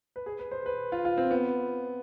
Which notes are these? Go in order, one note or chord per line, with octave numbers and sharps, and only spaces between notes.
B4
G#4
B4
C5
B4
F4
F4
C4
B3